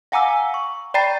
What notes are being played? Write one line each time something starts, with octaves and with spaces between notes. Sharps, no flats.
F5 F#5 G#5 A#5 D6 E6
C#6
D5 G5 A#5 B5 A6 C7